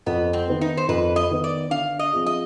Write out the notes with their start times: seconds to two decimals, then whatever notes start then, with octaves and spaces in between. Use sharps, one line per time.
0.06 F2 B3
0.33 C4
0.48 D#3 B3
0.61 D#4
0.77 C5
0.88 F2 B4
1.16 D#5
1.30 D#3 B3
1.44 D5
1.71 D3 F5
1.99 D#5
2.13 F3 C4 F4 G#4
2.26 D#5